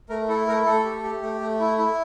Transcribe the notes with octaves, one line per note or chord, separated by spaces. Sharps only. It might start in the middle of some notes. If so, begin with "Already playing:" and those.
A3 A#4
E4 A4
A3 A#4
A3 A4
G4
G4
A3
A3
E4
E4